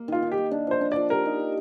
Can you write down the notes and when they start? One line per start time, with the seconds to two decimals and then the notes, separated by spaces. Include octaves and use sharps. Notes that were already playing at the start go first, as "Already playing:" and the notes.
Already playing: A#3
0.08 D#3 F4
0.22 D#3
0.32 G4
0.38 A#3
0.51 D4
0.67 F3 C5
0.81 D4
0.92 F3 D5
1.10 G4 A#4
1.25 D#4
1.40 G4